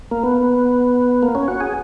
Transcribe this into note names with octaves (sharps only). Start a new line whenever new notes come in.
A#3
B3
A#3
C#4
F#4
G#4